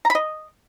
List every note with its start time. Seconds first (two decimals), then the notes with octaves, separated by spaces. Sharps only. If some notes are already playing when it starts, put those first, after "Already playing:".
0.05 A#5
0.10 B5
0.15 D#5